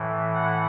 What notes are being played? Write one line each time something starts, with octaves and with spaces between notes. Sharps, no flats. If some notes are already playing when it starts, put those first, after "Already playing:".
Already playing: A2 E3
F#5